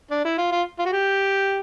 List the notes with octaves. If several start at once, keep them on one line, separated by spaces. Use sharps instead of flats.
D4
E4
F4
F4
F4
F#4
G4